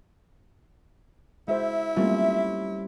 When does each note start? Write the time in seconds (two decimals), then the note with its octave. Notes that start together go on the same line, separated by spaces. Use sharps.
1.48 G#3 E4 F#4 C5 E5
1.96 G3 A3 A#3 C4 C#4 F4